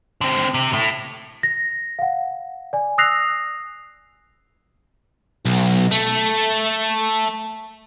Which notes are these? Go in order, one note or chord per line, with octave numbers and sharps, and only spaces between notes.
D3 C4
C3
A2 A3
A#6
F5 F#5
D5 G#5
D#6 E6 F#6 A#6 C7 F7
B1
A3